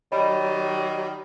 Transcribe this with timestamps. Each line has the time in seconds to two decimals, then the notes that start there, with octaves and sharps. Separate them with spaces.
0.12 D#3 F#3 G3 C#5 D#5 B5